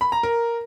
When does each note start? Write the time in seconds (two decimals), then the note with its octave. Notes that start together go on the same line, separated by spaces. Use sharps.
0.01 B5
0.12 A#5
0.23 A#4